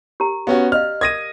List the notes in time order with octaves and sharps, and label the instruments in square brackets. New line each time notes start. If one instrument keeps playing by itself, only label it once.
[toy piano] G4 A#4 A#5
[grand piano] B3 C#4 F#4 [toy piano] G4 F5
[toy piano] D5 D#5 F5 [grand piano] F6
[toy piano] A#4 D#6 [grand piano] G#6 A#6 D#7